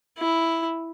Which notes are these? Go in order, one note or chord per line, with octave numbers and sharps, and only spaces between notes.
E4